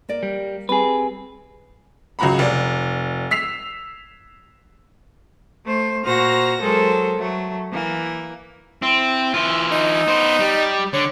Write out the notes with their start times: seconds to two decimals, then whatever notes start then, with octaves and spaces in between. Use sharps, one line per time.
0.09 A#3 A#4 D5
0.23 G3
0.69 G3 C4 G#4 B4
2.19 C#2 F#3 F#4 A#5 B5
2.39 F1 D5
3.31 E6 B6 C7 F7
5.64 A3 C5
6.04 A#2 F#4 C5 A#5 F6 A#6
6.60 F#3 G#3 A4 A#4 C5
7.17 F#3 A3
7.70 E3 A#3
8.82 C4 E4
9.34 E3 F4
9.72 D#4
10.08 B3 C5
10.40 G3
10.93 D3 C#5